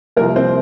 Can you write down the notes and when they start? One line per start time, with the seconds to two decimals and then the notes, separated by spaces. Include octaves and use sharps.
0.16 C2 C3 F3 A#3 A#4
0.36 C4 C5